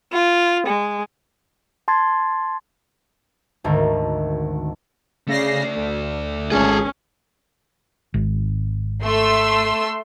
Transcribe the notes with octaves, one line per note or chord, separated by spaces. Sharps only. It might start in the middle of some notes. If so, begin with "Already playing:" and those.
F4
G#3
A5 C6 G#6 A6
G#1 D2 D#3 A4 A#4
C#3 A3 D5 A#6 C7
D2
G#1 C#2 C#4 G#4 A4
G#1
A3 C6 E6